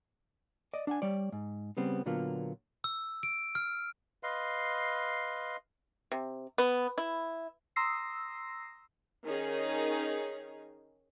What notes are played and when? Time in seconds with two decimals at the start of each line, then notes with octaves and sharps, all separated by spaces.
0.74 D5 D#5
0.87 D4 F#5 G#5
1.02 G3 C#5 D5
1.32 G#2
1.77 C#3 G3 B3 C4
2.06 A#2 D3 F#3 A#3 B3 F4
2.84 E6
3.23 D7
3.55 F6
4.23 B4 D#5 F5 C6
6.12 C3
6.58 B3
6.98 E4
7.76 A#5 C6 D#6 E6 A#6 C7
9.24 D#3 C#4 D#4 G#4